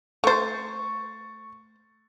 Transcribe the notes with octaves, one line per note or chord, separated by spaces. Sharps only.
A3 C5 C#6 A6